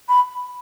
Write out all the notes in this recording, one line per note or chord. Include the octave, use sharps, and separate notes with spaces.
B5